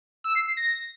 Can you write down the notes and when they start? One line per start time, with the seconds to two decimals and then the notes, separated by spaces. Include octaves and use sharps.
0.24 E6
0.35 C7
0.46 C7
0.57 A#6